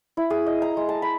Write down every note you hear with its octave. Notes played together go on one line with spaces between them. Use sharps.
E4
G#4
D#5
A#5
G#3
A5
B5